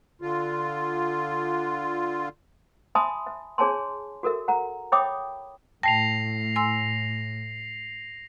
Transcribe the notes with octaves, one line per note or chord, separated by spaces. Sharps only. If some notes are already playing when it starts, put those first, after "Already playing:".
D3 F4
E5 G#5 A5 B5 C6 D#6
E5
D4 G#4 C#5 G#5 A5 C6
F#4 A4 A#4 E5
F#5 A#5
C#5 E5 G5 B5 D6 D#6
A2 G5 A5 A#6 C7 F7
G#5 C6 E6